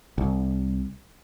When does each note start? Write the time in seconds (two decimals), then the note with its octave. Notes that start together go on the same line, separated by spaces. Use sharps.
0.18 C2